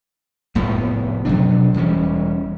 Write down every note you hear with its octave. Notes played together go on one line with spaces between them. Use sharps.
F1 A2 F3 B3
B2 F#3 D4
E1 E3 G3 C#4